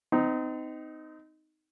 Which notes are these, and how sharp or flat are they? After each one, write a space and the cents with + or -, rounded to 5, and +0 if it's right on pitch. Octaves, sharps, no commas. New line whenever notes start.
C4 -35 D#4 +0